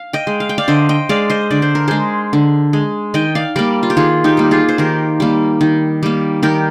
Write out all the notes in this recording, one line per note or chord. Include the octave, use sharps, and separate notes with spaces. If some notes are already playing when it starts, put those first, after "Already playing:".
Already playing: F5
D#5 G5
G#3
F5
G5
D5 F5
D3 C5 D#5
D#5 G5
G#3 D5 F5
C5 D#5
D3 D5
C5
A#4
G#3 G#4 C5
D3
G#3
D#3 D#5 G5
D5 F5
G3 A#3 A#4 D5
F4
G4
D#3 F4 G#4
D#4 G4
G3 A#3
F4 G#4
C5
D#3 G4 A#4
G3 A#3
D#3
G3 A#3
D#3 G4 A#4